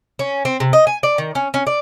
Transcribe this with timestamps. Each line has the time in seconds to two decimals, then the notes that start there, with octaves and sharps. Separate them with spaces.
0.19 C#4
0.45 C4
0.60 C3
0.73 D#5
0.87 G#5
1.03 D5
1.18 D#3
1.35 C#4
1.54 C#4
1.67 D5